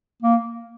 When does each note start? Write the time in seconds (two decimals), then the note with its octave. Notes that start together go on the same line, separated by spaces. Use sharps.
0.22 A#3